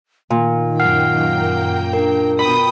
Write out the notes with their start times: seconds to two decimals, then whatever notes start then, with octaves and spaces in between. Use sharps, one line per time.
0.30 A#2 D#3
0.80 F#2 A#3 F#5 G5 F6 C7
1.93 D4 A#4
2.39 B2 G5 B5 D#6